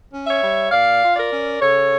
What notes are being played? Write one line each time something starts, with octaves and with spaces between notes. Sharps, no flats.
C#4
C#5 E5
G3
A#2 D5 F5
F4
A#4 D5
C#4
C#3 A4 C#5